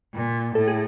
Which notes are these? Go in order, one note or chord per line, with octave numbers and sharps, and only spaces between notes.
A#2
A2 A4
G#4